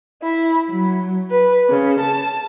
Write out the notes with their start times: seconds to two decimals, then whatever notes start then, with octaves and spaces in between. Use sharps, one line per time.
0.23 E4
0.68 F#3
1.30 B4
1.71 C#3
2.01 A5